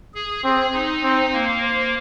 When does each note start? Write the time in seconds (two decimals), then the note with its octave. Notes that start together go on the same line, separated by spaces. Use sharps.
0.14 G#4
0.44 C4 G#4
0.74 D#4
1.04 C4
1.33 A#3
1.62 C5